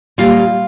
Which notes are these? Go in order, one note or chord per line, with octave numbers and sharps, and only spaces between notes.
A#2 G3 A#3 C#4 F4